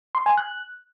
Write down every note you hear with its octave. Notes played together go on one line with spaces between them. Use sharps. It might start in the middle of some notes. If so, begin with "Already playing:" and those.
C6
G#5
F#6